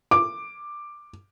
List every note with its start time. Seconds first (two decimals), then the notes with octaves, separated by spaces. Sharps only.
0.11 D6